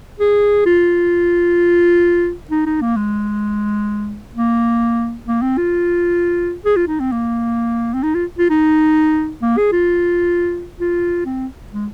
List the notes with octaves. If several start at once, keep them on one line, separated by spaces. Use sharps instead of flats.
G#4
F4
D#4
D#4
A#3
G#3
A#3
A#3
C4
F4
G#4
F4
D#4
C4
A#3
C4
D#4
F4
F4
D#4
A#3
G#4
F4
F4
C4
G#3